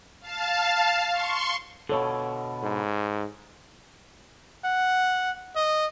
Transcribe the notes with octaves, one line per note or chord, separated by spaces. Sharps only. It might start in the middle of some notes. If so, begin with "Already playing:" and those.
F5 A5
C6 C#6
B2 D3 A4 C#5 F5
G#2
F#5
D#5